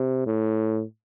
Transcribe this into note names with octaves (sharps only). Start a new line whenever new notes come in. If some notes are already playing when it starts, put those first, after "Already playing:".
Already playing: C3
A2